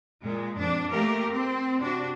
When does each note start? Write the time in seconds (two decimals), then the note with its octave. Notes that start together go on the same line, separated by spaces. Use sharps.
0.23 A#2 G#3
0.58 F2 D4
0.90 A3 A#3 G4 A#4
1.30 C4
1.81 C3 D4 F#4